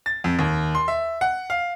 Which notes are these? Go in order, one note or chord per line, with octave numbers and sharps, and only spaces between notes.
A6
F2
D#2
C6
E5
F#5
F5